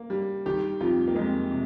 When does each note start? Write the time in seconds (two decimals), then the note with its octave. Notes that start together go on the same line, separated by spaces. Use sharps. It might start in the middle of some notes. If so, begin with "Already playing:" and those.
Already playing: A#3
0.10 G3
0.46 D#3 G4
0.80 F2 F4
1.08 A#3
1.15 F2 G#3
1.51 C3